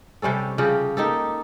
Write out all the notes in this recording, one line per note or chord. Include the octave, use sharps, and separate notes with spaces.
C3 G3 C#4 A4
C#3 F3 G3 G4
A#3 D#4 G4 A4